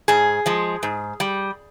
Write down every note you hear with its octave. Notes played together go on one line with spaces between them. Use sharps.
G#2 G#4
F3 G#3
G#2
G3